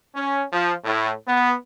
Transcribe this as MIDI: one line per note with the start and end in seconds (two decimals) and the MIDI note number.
0.15 0.44 61
0.53 0.73 53
0.84 1.12 45
1.28 1.53 59